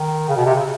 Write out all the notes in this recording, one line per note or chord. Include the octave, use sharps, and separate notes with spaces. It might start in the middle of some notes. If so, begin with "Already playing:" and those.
Already playing: D#3
C#3
B2
C3
C#3